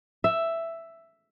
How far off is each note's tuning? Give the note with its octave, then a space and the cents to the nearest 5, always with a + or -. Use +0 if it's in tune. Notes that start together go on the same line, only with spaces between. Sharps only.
E5 +5